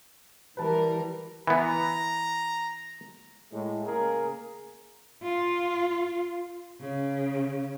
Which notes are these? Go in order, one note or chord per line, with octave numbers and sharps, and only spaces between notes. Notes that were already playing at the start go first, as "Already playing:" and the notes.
E3 G3 A#4 B4 A5
E3 B3 A#5
A2 G#3
C#3 A#3 G#4 A#4
F4
C#3